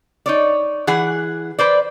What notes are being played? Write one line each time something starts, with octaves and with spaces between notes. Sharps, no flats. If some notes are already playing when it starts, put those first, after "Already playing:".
D#4 C#5 D5
E3 G#4 F#5
B4 C5 D5